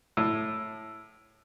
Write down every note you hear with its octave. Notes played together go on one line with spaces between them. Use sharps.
A2